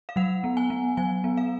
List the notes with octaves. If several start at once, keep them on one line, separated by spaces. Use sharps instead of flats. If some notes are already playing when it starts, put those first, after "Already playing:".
F5
F#3 F#5
B3
G#5
B3
F#3 G#5
B3
F5